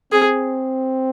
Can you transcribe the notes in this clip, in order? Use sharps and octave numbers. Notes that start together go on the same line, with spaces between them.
C4 G#4